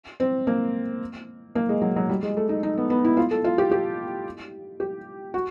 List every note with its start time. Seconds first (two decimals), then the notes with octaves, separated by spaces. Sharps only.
0.20 C4
0.47 A#3
1.55 A#3
1.69 G#3
1.82 F#3
1.96 F#3
2.09 G3
2.23 G#3
2.37 A3
2.49 D#4
2.63 D#4
2.77 B3
2.90 B3
3.05 E4
3.17 F4
3.31 A4
3.44 F4
3.58 G4
3.71 G4
4.80 G4
5.34 F#4